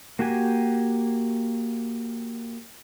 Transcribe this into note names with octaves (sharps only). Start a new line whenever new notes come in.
A#3 F#4 G4 G#5